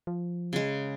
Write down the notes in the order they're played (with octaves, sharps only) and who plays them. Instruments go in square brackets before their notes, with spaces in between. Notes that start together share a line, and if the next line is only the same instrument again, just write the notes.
[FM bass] F3
[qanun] C#3 G#3